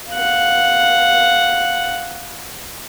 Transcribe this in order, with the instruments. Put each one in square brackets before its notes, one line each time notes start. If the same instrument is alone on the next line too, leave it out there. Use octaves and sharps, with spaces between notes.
[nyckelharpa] F5 F#5